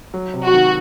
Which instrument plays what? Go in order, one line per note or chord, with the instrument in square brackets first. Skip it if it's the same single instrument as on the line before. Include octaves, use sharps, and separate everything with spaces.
[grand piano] F#3
C3
[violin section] F#4
[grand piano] D#3